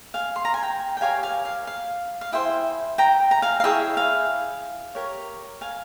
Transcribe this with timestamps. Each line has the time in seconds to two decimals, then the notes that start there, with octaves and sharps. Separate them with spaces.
0.14 F5 G#5
0.36 C6
0.45 A#5
0.54 G#5
0.63 G5 A#5
0.97 G5
1.01 G4 A#4 C#5 F5 G#5
1.23 F5 G#5
1.45 F5
1.67 F5
2.21 F5
2.32 E4 G#4 C5 E5 G5
2.98 G5 A#5
3.31 A#5
3.42 F5 G#5
3.60 F5
3.64 E4 G#4 C#5 E5 G5
3.97 F5 G#5
4.95 G4 A#4 C#5
5.61 F5 G#5